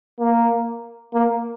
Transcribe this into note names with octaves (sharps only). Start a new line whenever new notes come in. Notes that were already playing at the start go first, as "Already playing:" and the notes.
A#3
A#3